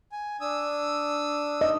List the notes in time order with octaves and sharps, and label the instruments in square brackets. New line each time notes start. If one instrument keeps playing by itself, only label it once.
[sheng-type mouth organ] G#5
D4 D#6 E6
[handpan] D#5